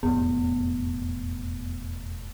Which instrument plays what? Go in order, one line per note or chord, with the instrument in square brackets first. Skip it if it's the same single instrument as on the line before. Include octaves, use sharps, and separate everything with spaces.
[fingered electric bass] E1 F2 A2 [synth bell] B3